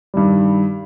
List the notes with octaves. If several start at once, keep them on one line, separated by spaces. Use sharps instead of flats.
G2 D#3 G3